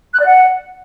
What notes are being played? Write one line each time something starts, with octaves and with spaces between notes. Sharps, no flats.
F#6
D5
F#5